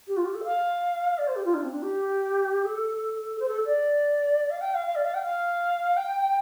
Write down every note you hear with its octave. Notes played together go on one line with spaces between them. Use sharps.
G4
F4
G4
A4
F5
D5
C5
G4
F4
D4
C4
D4
G4
A4
C5
A4
D5
F5
G5
F5
F5
D5
F5
G5
F5
G5